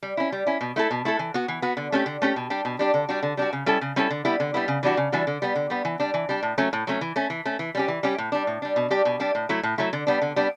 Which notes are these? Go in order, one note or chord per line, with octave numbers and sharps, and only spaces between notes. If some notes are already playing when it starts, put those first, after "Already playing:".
G3
C#4 E4
G3
C#4 E4
B2
A3 E4 A4
B2
A3 E4 A4
E3
B3 F#4
E3
B3 F#4
D3
A3 C#4 G4
D3
A3 C#4 G4
B2
G3 D4 G4
B2
G3 D4 G4
D3
G3 D4 F#4
D3
G3 D4 F#4
C#3
G3 C#4 E4 A4
C#3
G3 C#4 E4 A4
D3
G3 B3 E4
D3
G3 B3 E4
C#3
E3 G3 D4 F#4
C#3
E3 G3 D4 F#4
D3
G3 B3
D3
G3 B3
E3
G3 D4
E3
G3 D4
A2
F#3 A3 C#4
A2
F#3 A3 C#4
E3
A3 C#4
E3
A3 C#4
E3
G3 C#4 G4
E3
G3 C#4 G4
A2
G3 D4
A2
G3 D4
B2
G3 D4 G4
B2
G3 D4 G4
A2
F#3 A3 E4
A2
F#3 A3 E4
D3
G3 B3 D4
D3
G3 B3 D4